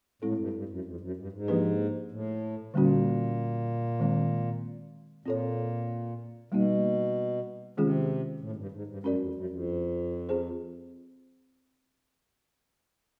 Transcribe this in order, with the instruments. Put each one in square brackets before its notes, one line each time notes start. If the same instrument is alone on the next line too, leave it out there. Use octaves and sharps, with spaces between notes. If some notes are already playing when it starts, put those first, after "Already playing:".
[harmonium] A2 [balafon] G#3 C4 E4 A4
[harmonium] G2
G2
F#2
F2
F#2
G2
G#2
[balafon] F3 A#3 D4 G4 B4
[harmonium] A2
[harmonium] A#2 [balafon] D3 G3 A#3 C#4 F#4
[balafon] D#3 G#3 C4
[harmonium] A#2 [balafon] C4 F4 A4 C#5
[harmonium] B2 [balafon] G3 A#3 D#4 F#4
[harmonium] C3 [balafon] D#3 G#3 C#4 F4 G#4
[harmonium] A2
G#2
G2
G#2
G2
[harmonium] F#2 [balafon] G#3 C#4 F#4 A#4 D5
[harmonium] F2
F#2
F2
[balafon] C4 F4 G#4 C5